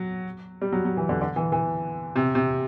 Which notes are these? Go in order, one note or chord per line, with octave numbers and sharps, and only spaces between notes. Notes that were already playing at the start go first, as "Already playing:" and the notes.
Already playing: F#3
G3
F#3
F#3
E3
D3
D3
E3
E3
C3
C3